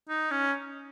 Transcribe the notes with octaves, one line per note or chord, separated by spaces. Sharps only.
D#4
C#4